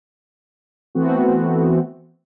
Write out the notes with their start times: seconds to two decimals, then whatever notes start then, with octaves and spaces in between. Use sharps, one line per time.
0.95 E3 A3 B3 C4 F#4